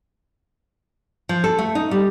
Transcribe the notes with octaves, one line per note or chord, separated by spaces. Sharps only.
F3
A4
A3
D#4
G3